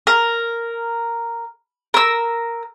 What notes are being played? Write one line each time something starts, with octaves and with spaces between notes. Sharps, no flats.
A#4
A#4 E6